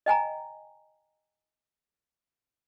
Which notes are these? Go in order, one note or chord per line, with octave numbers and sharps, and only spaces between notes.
D#5 G5 G#5 A#5